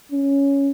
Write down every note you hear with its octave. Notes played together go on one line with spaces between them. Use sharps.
C#4